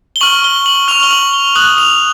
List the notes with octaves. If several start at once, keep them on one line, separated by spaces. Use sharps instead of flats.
G7
C#6 F6 F#7
G7
F#7
C#6 F6 F7
G7
F#7
G7
D#6 F#6 F#7
F7